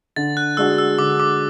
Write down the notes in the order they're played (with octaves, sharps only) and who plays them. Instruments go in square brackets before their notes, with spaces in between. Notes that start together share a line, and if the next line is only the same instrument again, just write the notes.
[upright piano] D3 [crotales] A6
[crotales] F#6
[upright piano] G#3 D4 F#4 [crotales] E6
[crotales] E6
[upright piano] D3 [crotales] D6
[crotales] D6